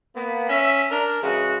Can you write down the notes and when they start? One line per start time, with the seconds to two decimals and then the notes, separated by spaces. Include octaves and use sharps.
0.15 A#3 B3
0.49 C#4 E5
0.91 D4 A#4
1.23 C#3 E3 G#3 F#4